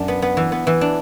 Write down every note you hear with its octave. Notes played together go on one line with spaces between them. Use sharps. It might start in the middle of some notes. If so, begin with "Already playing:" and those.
Already playing: F#2 D4
B3
B3
E3
B3
E3
D4